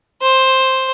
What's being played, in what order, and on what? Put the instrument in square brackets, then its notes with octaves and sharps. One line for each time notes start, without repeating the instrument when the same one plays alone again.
[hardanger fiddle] C5